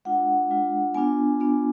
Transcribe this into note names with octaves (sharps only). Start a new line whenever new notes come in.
G#3 D4 F4 F#5
G#3 D4 F4
B3 D4 F4 G#5
B3 D4 F4